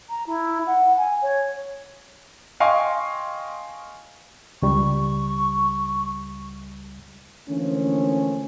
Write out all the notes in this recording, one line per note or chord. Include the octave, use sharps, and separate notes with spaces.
A#5
E4
F#5
G#5
C#5
D#5 F5 G5 G#5 C6 C#6
C#2 G3 C#6
D3 E3 F3 A3 A#3 C#4